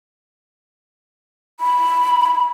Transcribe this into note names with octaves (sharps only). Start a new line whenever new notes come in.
B5